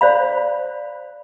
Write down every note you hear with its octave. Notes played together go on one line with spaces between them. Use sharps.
C5 D5 F5 B5